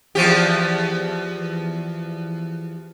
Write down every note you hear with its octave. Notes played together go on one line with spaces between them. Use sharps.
E2 F3 G4